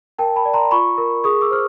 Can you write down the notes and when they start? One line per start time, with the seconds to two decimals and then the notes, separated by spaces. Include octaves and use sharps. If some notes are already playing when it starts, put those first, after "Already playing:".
0.19 A#4 G5 A5
0.36 A5 B5
0.45 D5
0.54 A#5 C6
0.71 F4 B5 C#6
0.98 A#4
1.24 G#4 C#6 D#6
1.41 D6 E6
1.50 C5 F6